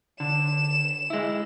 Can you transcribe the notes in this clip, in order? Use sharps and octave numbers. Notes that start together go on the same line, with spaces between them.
D3 E7
G#3 E4